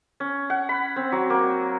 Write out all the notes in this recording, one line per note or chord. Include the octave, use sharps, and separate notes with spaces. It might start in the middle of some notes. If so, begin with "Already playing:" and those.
C#4
F#5
B5
C4
F#3
A#3